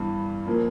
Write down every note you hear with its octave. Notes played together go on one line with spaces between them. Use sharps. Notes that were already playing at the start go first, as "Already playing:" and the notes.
Already playing: G2 E3 G3 B3
A#2 F3 A#3